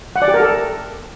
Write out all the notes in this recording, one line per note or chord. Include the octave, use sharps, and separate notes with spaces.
F#5
D5
G4
A#4
A4